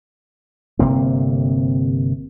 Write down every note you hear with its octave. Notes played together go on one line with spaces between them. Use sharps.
G1 C3 A#3 C4